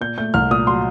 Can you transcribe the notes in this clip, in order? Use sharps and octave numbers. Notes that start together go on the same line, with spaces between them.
A#2 G6
A3 G6
C2 F6
A#2 D#6
F#3 C6